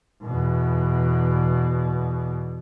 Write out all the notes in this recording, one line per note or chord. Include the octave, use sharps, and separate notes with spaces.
E2 B2